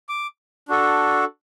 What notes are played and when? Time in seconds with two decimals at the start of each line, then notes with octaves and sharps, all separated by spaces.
0.09 D6
0.68 D4 F#4 A4